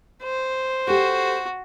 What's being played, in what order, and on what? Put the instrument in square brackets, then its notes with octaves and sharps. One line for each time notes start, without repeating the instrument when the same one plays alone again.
[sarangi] C5
[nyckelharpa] F#4 [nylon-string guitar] G4 A4